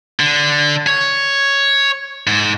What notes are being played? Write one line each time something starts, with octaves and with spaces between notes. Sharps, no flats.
D3
C#5
G#2